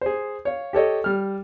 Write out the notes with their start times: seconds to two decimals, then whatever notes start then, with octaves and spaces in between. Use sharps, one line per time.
0.01 G#4 C5
0.45 C#5 F5
0.73 G4 A4 C#5 D#5
1.04 G3 F6